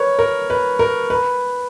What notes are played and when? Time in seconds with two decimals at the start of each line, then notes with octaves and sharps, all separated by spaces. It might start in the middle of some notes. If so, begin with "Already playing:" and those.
Already playing: A#4 B4 C#5
0.19 A#4
0.50 B4
0.79 A#4
1.10 B4